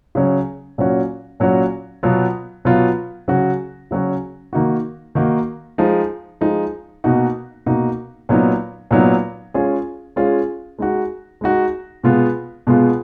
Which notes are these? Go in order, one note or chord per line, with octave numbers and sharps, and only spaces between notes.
C#3 F#3 C#4
A#2 F#3 C#4 F#4
A#2 F#3 C#4 F#4
B2 F#3 B3 F4
B2 F#3 B3 F4
C#3 F#3 C#4 F#4
C#3 F#3 C#4 F#4
D#3 A#3 D#4 F#4
D#3 A#3 D#4 F#4
F3 G#3 D#4
F3 G#3 D#4
B2 A#3 D#4 F#4
B2 A#3 D#4 F#4
A#2 F#3 B3 D#4
A#2 F#3 B3 D#4
G#3 C#4 F4 G#4
G#3 C#4 F4 G#4
G#3 D#4 F#4
G#3 D#4 F#4
B2 G#3 B3 F4
B2 G#3 B3 F4